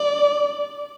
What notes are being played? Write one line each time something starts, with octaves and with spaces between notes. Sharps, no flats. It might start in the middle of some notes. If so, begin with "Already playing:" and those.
Already playing: D5